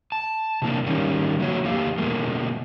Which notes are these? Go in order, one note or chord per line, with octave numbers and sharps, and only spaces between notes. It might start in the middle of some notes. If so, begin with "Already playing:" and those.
A5
C3 E3 A#3 D4
G#2 D#3 G3 A#3 C#4
F3 A3 A#3 F#4 C#5
E2 D3 A#3 G4 F5
B2 D3 F3 G#3 A#3